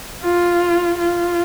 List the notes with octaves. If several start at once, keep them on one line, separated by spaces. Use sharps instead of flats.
F4
F4